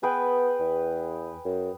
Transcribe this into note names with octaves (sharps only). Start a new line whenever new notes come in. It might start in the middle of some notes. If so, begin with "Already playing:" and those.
B3 G#4 B4 G5
E2
F#2